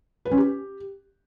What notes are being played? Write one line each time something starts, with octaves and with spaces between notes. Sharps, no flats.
B4
C#4
G4